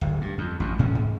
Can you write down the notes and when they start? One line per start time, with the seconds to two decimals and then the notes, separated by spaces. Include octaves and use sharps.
0.01 D1 G1
0.21 G2
0.38 F2
0.60 A1 F#2
0.78 D2 G#2 C#4
0.95 G#2